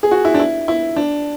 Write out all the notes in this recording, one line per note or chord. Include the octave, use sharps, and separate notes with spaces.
G#4
F#4
E4
D4
E4
E4
D4